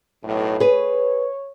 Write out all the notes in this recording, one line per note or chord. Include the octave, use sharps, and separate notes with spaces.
B1 A2
G#4 B4 C#5